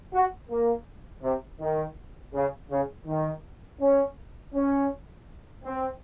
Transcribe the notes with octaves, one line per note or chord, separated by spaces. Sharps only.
F#4
A#3
C3
D#3
C#3
C#3
D#3
C#4
C#4
C4